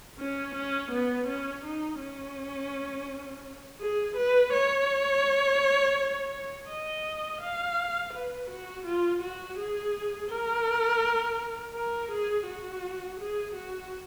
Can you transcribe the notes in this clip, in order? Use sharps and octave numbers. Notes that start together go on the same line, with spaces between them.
C#4
C#4
B3
C#4
D#4
C#4
G#4
B4
C#5
D#5
F5
B4
F#4
F4
F#4
G#4
A#4
A#4
G#4
F#4
G#4
F#4